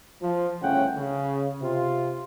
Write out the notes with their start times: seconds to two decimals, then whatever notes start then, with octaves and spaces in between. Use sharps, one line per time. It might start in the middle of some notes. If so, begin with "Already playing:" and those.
0.22 F3
0.61 G1 A2 C#3 C#4 F#5 G5
0.97 C#3
1.61 C3 F4